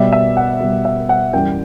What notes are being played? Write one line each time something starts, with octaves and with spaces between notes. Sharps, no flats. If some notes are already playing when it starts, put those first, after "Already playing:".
Already playing: B2 G3 E5
E5
F#5
B2 G3
E5
F#5
F#2 E3 G3 G5